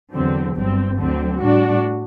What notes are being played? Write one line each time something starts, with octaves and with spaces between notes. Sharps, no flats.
E2 D3 F#3 C4
G1 G2 F#3 C4
D2 D3 F#3 C4
A2 G3 D4 F#4